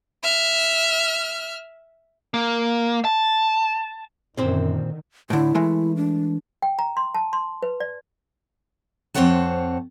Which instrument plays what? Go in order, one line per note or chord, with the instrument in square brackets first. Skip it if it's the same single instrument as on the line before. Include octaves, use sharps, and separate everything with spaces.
[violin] E5 F6
[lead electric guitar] A#3
A5
[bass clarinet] F#2 [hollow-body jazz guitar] A#2 C4 C5 [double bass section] D3 D#3
[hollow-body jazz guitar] A2 D3 [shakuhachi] E4
[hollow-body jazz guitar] E3 G#3 A3
[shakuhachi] D4
[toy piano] G5
A#5
C6
A5
C6
B4
D5
[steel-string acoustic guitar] F2 C4 C5 C#5 F#5 A5